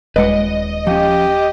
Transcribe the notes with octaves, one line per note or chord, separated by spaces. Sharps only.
D#1 G#3 B4 D5 D#5 F#5
F3 C#4 G4